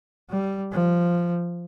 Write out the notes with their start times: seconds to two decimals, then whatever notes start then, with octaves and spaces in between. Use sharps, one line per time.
0.30 G3
0.72 F3